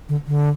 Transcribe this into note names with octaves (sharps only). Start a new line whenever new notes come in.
D3
D3